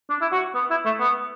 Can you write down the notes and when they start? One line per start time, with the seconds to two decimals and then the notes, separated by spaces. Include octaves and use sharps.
0.10 D4
0.21 E4
0.32 F#4
0.55 B3
0.71 E4
0.85 A3
1.00 B3